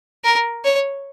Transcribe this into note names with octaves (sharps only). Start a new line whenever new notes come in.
A#4
C#5